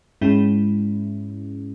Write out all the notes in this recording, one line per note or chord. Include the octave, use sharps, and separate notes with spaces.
G#2 G#3 C#4 E4